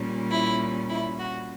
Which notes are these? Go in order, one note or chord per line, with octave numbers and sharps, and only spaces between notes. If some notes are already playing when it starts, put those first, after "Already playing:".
Already playing: A#2 G3 C#4
E4
E4
F#4